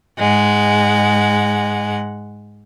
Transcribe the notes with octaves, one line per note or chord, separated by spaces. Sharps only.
G#2 G#3 F#5